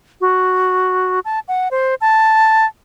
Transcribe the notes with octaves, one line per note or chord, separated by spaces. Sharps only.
F#4
A5
F#5
C5
A5